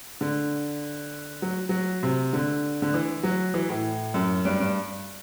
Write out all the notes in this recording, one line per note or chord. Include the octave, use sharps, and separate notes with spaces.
D3
F#3
F#3
C3
D3
D3
E3
F#3
E3
A2
F#2
G2
G2